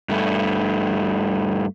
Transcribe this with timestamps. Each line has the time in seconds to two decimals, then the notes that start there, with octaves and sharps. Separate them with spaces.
0.09 G2 A3